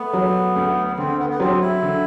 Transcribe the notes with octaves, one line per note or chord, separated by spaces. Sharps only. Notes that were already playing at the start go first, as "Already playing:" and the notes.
Already playing: A3 B3
F#3
D2
B3
D3 C4
B3
B3
F#3 C4
E4
D3